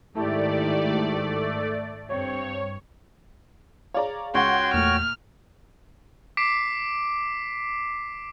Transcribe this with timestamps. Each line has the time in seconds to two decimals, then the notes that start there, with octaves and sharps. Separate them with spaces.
0.15 G#2 D#3 A3 E4 G4 D5
2.09 G2 C4 C#5
3.94 G#4 C#5 D5 F5 A#5
4.34 C#2 F#4 C#5 F#5 G5 C6
4.74 E2 A#2 A3 F6
6.37 D6 B6 C7 D7